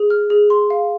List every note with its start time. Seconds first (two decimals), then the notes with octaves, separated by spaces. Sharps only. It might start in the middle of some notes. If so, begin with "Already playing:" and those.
Already playing: G#4
0.10 F6
0.30 G#4
0.50 C6
0.70 F5